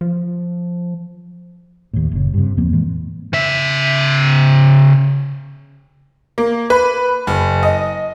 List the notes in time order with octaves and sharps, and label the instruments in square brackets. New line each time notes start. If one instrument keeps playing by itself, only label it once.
[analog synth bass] F3
[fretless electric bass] D#2 A2
F#1 C#3
G2 C3
E2 F3 A#3 C4
A2 E3 G#3
[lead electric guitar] C#3 E5
[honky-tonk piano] A#3
B4
F#1
D#5